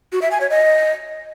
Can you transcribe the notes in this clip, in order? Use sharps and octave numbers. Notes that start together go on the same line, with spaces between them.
F#4
E5
G#5
C#5
D#5